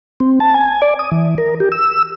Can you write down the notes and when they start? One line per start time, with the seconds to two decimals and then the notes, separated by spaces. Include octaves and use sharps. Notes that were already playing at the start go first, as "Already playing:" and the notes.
0.20 C4
0.40 A5
0.54 G#5
0.82 D5
0.99 D#6
1.12 E3
1.38 A#4
1.60 G4
1.72 E6